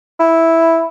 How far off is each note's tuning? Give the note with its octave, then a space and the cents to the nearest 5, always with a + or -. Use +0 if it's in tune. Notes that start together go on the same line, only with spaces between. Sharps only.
E4 -5